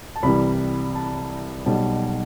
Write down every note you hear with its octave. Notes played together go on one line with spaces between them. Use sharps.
A5
C2 C3 E3 G3 B5
A5
B1 B2 G3 A5